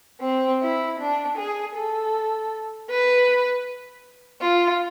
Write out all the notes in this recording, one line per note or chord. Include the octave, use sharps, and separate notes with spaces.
C4
E4
D4
G#4
A4
B4
F4